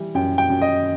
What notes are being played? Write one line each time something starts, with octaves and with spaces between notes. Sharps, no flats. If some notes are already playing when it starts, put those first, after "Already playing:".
Already playing: E3 G3
F#2 G5
G5
F#2
D#5